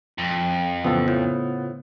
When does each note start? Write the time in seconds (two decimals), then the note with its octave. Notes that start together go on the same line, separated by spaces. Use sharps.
0.18 F2
0.84 A1 C#3 B3 F4 A4 C5
1.08 A2